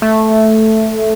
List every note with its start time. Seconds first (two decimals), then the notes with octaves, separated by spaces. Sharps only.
0.02 A3